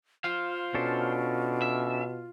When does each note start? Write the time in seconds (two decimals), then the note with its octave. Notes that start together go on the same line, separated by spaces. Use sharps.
0.24 F4 C5 F5
0.75 B2 C#4 D4 A4
1.62 E5